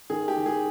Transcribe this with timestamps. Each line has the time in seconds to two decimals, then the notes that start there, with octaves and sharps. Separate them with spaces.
0.10 D#3 G#4
0.28 G4
0.36 D#3
0.46 G#4